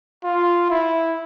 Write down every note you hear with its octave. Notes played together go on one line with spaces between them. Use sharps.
F4
E4